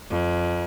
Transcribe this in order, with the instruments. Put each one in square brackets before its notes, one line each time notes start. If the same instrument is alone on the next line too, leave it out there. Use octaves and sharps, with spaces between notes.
[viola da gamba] F2